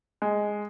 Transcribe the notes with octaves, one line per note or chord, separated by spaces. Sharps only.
G#3